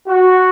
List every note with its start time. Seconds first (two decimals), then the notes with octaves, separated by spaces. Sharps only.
0.08 F#4